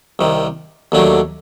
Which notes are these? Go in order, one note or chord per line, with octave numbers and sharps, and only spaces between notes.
C2 C3 D#3
D#2 D3 F#3 A3 D4